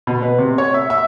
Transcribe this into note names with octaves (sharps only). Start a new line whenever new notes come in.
B2
B4
C3
C#5
E5
E5